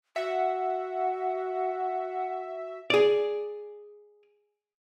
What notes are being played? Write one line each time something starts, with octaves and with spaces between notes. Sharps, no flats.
F#4 E5 F#5
G#4 D5